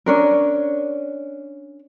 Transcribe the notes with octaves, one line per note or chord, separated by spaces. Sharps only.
C#4 D4 A#4